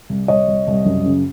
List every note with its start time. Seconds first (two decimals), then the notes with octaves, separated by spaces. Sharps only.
0.09 C2
0.28 C2 C#5 D#5
0.48 C2
0.67 C2
0.85 F#1
1.06 C#3